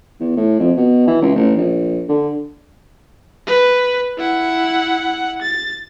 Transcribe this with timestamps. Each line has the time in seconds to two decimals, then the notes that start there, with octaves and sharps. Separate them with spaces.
0.20 E2
0.37 A2
0.60 F2
0.77 B2
1.07 E3
1.22 C#2
1.36 A1
1.57 A#1
2.09 D3
3.47 B4
4.18 E4 F#5
5.42 A6